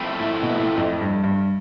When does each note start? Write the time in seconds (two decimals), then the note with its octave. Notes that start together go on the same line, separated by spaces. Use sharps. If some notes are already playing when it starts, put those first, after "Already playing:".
Already playing: F3 A3 C4 E4
0.19 A2
0.43 B2
0.54 A2
0.78 F2
1.01 G2
1.24 G2